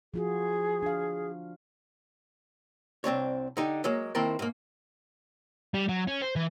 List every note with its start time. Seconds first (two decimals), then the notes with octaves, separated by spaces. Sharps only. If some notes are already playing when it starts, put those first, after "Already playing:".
0.14 F3 F4 F#4 G#4
0.82 D4 F5
3.04 C2 C4 D4 C#5
3.57 D3 D#4 G4
3.84 F#3 G#3 A#3
4.15 D#3 A#3 C4 E4 A#4 A5
4.39 G#2 A#3
5.74 G3
5.89 F#3
6.08 C#4
6.22 C5
6.36 E3